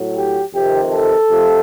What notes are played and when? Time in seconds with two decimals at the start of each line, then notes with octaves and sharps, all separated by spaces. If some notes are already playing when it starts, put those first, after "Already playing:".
Already playing: A2 F#3
0.17 G4
0.53 F2 C3 D#3 G4
0.90 A4
1.28 F2 C3 F3